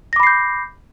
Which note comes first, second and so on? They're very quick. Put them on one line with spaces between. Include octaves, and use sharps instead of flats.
A#6 D6 B5 C7 G6